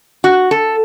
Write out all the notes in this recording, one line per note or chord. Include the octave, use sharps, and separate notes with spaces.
F#4
A4